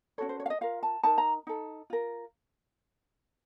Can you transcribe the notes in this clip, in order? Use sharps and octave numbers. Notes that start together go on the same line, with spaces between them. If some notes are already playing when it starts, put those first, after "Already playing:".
C#4 F#4 A4 C#5
C5
C#5
F5
D#5
F4 A#4 F5
A5
D#4 A#4 A5
A#5
D#4 A4
F4 A#4